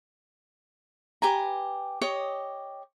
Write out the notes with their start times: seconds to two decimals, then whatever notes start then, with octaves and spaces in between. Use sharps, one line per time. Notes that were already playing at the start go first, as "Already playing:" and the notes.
1.22 G4 B4 G#5 A#5
2.01 G4 C#5 D#5 D#6